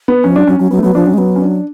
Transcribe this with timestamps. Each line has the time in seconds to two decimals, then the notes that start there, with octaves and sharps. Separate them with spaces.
0.08 B3
0.24 F3 C#4
0.36 F#3 D4
0.47 F#3 C#4
0.59 F#3 C#4
0.71 F#3 B3
0.79 A3
0.83 F#3 B3
0.95 F3 D4
1.06 F#3 C#4
1.14 G#3
1.18 F#3 B3
1.36 C#4
1.42 D4